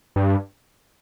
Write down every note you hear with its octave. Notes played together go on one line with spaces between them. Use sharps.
G2